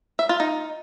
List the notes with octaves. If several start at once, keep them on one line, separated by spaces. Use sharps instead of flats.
E5
F4
D#4